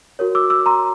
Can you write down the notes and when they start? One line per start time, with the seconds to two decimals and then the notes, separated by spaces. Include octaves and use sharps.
0.19 F#4 A#4 C#5
0.35 D6 E6
0.50 D6 E6
0.66 A#5 C6